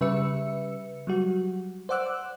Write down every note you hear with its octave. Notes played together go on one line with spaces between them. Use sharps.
C#3 G3 B4 E5 E6 C#7
F#3 G3 F#4
C5 D5 F#5 D6 E6 F#6